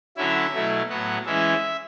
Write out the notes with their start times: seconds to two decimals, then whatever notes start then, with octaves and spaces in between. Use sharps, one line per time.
0.17 D3 F#3 C#4 E4 E5
0.54 B2 F#3 A3 E4
0.89 A2 F#3 B3 F#5
1.26 E3 G#3 C#4 E4 E5